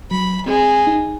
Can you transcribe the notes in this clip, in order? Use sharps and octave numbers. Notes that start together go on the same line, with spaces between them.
F#3 B5
G#3 C4 G#4
D#4